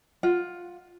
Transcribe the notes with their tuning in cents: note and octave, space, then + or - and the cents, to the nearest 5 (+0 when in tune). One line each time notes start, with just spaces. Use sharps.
F4 +10 F#5 +0